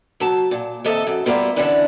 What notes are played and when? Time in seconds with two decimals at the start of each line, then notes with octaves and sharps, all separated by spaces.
0.20 F#3 A5
0.51 A#2
0.84 D#2 C3 A4 D#5 E5
1.07 F#2
1.26 G3 A#3 B3 E4 F4 G4
1.56 D3 E3 B3 C#4 D4 E4